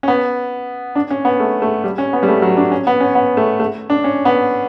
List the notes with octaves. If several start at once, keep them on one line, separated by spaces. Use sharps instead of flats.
C#4
B3
D4
C#4
B3
A3
A3
G3
C#4
B3
G3
A3
F#3
D4
C#4
B3
C#4
B3
A3
A3
D4
C#4
B3